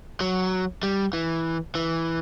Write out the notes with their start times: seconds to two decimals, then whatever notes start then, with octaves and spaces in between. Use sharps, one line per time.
0.21 F#3
0.83 G3
1.13 E3
1.75 E3